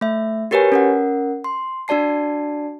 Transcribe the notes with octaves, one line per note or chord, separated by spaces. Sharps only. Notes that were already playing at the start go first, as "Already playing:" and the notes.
A3 E5
F#4 G4 A#4 B4 C#5 G#5
C#4 A#4 F#5
C6
D4 F#4 D5 A5 C7